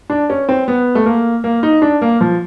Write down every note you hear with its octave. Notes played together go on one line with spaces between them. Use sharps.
D4
C#4
C4
B3
A3
A#3
A#3
D#4
D4
A#3
F3